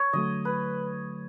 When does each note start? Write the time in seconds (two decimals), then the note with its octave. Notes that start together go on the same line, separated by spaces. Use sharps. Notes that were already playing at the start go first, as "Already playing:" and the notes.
Already playing: C#5
0.13 D3 F#3 A3 D#5
0.45 B4